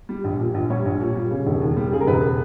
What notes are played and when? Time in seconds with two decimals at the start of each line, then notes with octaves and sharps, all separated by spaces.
0.09 G3
0.24 A#1
0.40 A#2
0.54 A#1
0.70 G3 C#5
0.85 A#1
1.00 A#2
1.16 G3
1.31 C#3
1.46 E1
1.61 D#2
1.77 G3
1.92 C#3 G#4
2.01 A#4
2.07 E1 B4